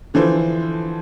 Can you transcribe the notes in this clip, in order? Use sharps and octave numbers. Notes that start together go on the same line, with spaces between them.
D3 E3 F3 C5